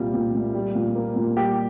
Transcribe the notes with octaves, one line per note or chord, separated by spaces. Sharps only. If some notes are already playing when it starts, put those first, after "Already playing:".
Already playing: C2 A#2 G3
A#2
A#2
G3
A#2
A#3
A#2
G3 G4